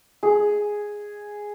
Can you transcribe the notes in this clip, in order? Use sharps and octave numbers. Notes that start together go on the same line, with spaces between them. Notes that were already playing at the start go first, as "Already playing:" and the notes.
G#4